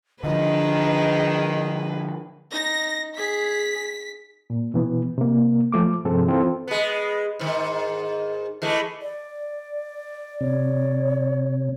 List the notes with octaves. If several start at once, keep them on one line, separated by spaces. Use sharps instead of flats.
D3 D#3 F3 D4 G#4 B4 D#5
D#4 A#6
G#4 B6
A#2
B2 E3 B3
C3 A#3
F3 A3 D6
G2 C3 F3 C4 G#4 A4
E3 C4 F4 A4
G#3 B3
G#2 D#3
E3 G#3 A3
D5
C3 C#5